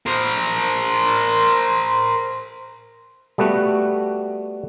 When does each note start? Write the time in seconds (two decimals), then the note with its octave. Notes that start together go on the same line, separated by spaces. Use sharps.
0.06 A#4 C5
3.38 G3 A3 B3 F#4